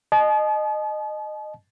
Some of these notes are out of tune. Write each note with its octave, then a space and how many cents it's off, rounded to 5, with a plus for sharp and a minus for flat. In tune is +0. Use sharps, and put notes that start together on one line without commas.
D#5 -20 A5 -45